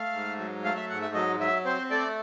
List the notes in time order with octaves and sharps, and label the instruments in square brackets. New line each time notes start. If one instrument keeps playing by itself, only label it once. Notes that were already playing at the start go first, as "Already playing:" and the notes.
Already playing: [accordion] A3 F5
G#2
F#3
A3 F5
E5
G#2 F#5
E5
F#3 D#5
F#3 E5
C4 C5
A3 D5